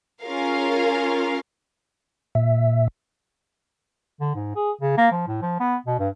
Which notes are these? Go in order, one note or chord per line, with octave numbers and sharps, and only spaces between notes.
C#4 F4 G#4 A#4 F5
A#2 E5
D3
G#2
G#4
C#3
A#3
F3
A2
F3
B3
B2
G2